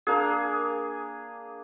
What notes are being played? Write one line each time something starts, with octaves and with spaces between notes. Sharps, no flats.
A#3 D4 G#4